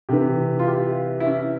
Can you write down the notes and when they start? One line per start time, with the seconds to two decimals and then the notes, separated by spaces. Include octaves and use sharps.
0.09 C3 E3 G4
0.59 F4
0.68 G4
1.20 E4
1.27 C#4